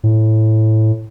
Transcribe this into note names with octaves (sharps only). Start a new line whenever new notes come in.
A2